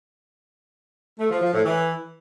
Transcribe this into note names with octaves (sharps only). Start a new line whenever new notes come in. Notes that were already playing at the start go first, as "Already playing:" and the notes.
A3
F3
F3
A2
E3